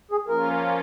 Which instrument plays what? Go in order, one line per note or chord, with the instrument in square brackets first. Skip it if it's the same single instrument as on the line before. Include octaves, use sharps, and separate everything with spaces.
[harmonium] G#4
[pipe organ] F3 A#3 C#4 F4 [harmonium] A#4